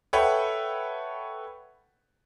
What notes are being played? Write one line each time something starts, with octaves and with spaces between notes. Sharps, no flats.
A4 B4 C#5 E5 F#5 G5